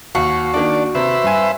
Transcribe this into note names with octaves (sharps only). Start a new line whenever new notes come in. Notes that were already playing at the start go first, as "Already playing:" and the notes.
D#2 F#4
D#3 A#3 D4 D5
C3 B4 C5 E5
G2 G#5